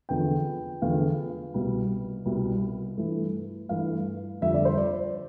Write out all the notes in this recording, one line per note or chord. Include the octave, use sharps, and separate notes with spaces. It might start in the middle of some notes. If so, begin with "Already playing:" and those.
E2 D3 F3 G5
E2 D3 F3 F5
C2 B2 G3
C2 B2 G3
G2 E3 A3
G2 E3 A3 F5
F2 D3 G3 E5
D5
C5
D5